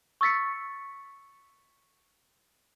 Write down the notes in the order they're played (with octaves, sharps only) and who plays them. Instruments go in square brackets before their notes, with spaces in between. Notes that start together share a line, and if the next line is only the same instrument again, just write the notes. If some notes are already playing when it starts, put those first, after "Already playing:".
[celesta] C#6 E6 A6 B6 C#7